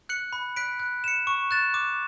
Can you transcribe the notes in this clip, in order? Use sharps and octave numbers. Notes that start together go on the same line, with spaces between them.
F#6 C#7 F#7
B5
F#6 B6 D7
F#6
C#7 E7
C#6
F#6 A6 E7
D6